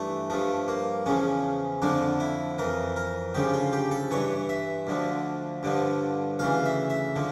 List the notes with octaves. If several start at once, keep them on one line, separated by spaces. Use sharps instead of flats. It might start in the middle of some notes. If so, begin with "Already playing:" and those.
Already playing: G2 E3 A3
G2 F3 A3
A#3
E2 C#3 F3 C#4
F2 D3 F3 D4
E4
F2 E3 A#4
A#4
D2 C#3 F3 G4
F4
G4
A4
G2 E3 C#5
E5
D2 D3 F3
G2 D3 F3
D2 C#3 E3 F5
E5
E5
D3 F3